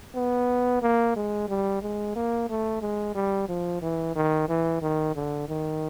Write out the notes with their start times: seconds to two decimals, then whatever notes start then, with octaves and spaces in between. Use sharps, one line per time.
0.16 B3
0.82 A#3
1.16 G#3
1.48 G3
1.82 G#3
2.16 A#3
2.49 A3
2.82 G#3
3.15 G3
3.48 F3
3.82 E3
4.16 D#3
4.49 E3
4.82 D#3
5.16 D3
5.49 D#3